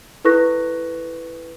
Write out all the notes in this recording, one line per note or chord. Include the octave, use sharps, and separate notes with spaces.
E4 A4 B4 C#6 F#6 A#6